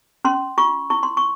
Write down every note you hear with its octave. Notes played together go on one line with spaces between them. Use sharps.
C#4 C6
F4 C#6
E4 C#6
C6
C#6